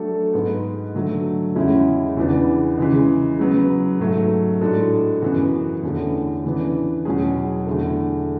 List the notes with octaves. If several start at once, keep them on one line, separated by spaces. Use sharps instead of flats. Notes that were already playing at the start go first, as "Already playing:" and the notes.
Already playing: F#3 A3 D4 A4
G#2 G#3 B3
D3 F#3 A3
E2 C#3 G#3 C#4 E4
E2 C#3 E3 B3 D4
C#3 E3 G#3
C#3 F#3 B3
G#2 F#3 A3
A2 G#3 D4 F#4 A4
F#2 E3 B3 F#4
E2 D3 A3 C#4
C#3 E3 B3 D4
E2 B2 F#3 C#4 G#4
E2 D3 A3